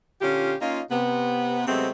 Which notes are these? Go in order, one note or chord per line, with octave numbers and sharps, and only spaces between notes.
A#2 D3 C#4 F4 G4
A#3 C#4 D#4 F4
C3 B3
C3 F#3 G#3 A3 B3 C4